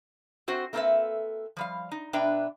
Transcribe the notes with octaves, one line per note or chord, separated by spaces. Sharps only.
C4 F#4 C5 F#5
A3 A#3 C4 A4 B4 E5
F3 G3 F5
D#4
B2 D4 B4 E5 G5 A#5